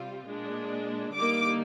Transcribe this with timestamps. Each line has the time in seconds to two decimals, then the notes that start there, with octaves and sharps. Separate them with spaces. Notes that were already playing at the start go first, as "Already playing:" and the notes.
Already playing: C3 G3 C4 F4
0.26 A#2 G#3 D4
1.13 D3 G3 A#3 D#4 D6